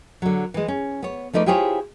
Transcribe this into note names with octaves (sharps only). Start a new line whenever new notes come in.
D3 F#3
E3 G#3
C#4
B3 C#5
F3 A3 D#4 B4 D5
E4 F4 G4 G#4 C5 C#5